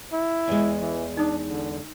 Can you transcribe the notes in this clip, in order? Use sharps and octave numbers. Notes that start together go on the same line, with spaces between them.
E4
E2 G#3
E3
D4 D#4 D#6
D3